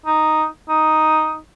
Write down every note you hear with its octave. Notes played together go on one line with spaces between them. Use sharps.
D#4
D#4